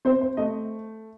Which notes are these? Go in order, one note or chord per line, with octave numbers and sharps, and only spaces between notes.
C4 C5
C5
A3 D#5